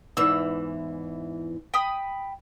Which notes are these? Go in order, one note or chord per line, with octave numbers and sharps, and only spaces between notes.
E2 G#2 E3 E6
G5 B5 D#6